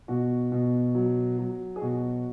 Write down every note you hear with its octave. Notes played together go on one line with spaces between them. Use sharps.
B2 F#4
B2
F#3
F#3
G#4
B2 F#4